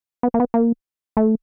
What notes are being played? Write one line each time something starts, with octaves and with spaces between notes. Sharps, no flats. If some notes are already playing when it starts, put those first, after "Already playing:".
B3
A#3
B3
A#3
A3